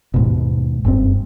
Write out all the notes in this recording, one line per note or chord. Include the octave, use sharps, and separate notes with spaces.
D#2 G#2 B2
F#1 G2 C3 C4